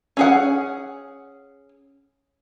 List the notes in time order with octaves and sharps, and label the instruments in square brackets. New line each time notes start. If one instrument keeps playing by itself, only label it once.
[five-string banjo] C#4 G#4 F#5